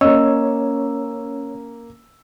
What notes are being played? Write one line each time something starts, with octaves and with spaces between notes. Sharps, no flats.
A#3 C#4 C#5 D#5 E6